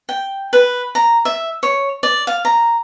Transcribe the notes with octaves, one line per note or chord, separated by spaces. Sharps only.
G5
B4
A#5
E5
C#5
D5
F5
A#5